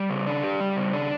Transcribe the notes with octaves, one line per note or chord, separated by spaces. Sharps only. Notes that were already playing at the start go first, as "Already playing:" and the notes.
Already playing: G3
C#3
D4
G4
G3
C#3
D4